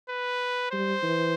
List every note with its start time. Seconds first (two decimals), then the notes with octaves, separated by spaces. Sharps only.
0.09 B4
0.71 G3 C5
1.03 E3